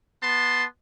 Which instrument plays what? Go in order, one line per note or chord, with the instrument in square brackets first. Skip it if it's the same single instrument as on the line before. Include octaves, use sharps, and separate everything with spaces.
[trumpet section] B3 A5 C6